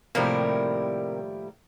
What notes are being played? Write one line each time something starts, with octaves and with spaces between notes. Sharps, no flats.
A2 C3 D#3 F3 G3 A#3 E4 A#4